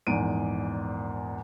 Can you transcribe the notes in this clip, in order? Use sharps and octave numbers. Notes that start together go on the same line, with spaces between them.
A#1 E2 G#2 D7 D#7